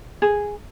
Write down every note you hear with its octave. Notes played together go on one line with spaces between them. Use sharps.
G#4